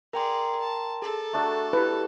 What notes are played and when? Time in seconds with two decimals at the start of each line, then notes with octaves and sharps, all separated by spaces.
0.13 G#4 A#4 D5 G5 A#5 C6
0.60 A5
1.02 G#4 A4
1.33 A3 D4 F#4
1.73 E4 G4 B4